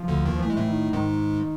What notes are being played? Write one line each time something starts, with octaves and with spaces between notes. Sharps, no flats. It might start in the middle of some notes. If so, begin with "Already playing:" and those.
Already playing: F3
D2 D3
D#2 D#3
F3
E3 A3
G#3
A2 A3
D#3
G#2 D#3 G#3